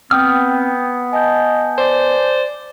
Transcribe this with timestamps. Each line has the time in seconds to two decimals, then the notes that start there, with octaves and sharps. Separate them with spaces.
0.11 B3 C4 F#5 G5 D#6 F6 G6
1.13 D#5 G#5 A5 G6
1.78 C5 D5